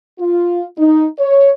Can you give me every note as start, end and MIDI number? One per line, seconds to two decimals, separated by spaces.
0.19 0.63 65
0.77 1.06 63
1.18 1.51 73